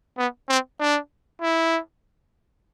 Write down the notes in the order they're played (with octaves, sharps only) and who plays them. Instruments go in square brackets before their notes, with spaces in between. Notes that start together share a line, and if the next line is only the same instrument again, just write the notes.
[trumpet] B3
C4
D4
E4